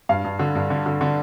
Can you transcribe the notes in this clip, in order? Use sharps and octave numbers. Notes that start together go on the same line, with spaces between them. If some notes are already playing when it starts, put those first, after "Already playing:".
G2 F5
G2
D3
G2
D3
D3
D3